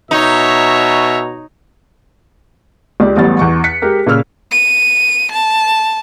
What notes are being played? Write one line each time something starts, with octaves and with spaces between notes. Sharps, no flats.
B2 D#4 C#5 E5 A#5
C#2 G4 D5
A1 F#3 G3 B3 A6
E2 C#6
F#6 B6 C#7
G#3 G4 A#4
A#2 C#3 E6 F6
D#7
A5